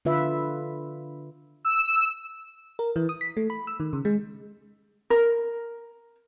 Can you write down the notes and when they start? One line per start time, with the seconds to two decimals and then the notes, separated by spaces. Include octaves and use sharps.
0.05 D3 F4 B4 E5
1.65 E6
2.79 A#4
2.96 E3
3.09 D#6
3.21 B6
3.37 A3
3.50 B5
3.67 E6
3.80 D#3
3.93 C#3
4.05 G#3
5.10 A#4